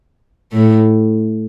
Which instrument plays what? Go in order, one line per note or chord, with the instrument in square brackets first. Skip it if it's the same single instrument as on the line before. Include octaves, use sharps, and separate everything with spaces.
[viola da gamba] A2 A3